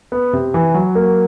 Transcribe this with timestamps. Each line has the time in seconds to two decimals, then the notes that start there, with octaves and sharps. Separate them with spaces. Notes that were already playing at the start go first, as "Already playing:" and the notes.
0.12 B3
0.33 C3
0.54 E3
0.74 F#3
0.95 A#3